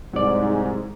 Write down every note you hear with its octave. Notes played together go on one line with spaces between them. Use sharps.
C2 G#2 F#3 D5